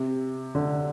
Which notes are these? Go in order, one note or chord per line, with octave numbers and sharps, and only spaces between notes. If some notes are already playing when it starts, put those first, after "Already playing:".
Already playing: C3
D3